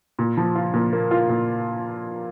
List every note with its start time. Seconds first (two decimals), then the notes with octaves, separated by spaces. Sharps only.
0.19 A#2
0.37 F3
0.55 F4
0.74 A#2
0.93 A#3
1.11 F4
1.29 A#2